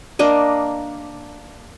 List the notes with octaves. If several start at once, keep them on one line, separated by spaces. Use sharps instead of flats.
A#3 D4 D#5